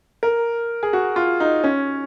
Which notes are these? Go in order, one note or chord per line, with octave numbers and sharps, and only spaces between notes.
A#4
G#4
F#4
F4
D#4
C#4